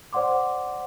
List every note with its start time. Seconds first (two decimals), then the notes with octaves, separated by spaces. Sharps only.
0.13 C5 D5 F#5 C6 D6